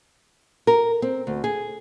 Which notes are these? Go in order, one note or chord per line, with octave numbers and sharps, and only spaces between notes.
A#4
C4
D2
G#4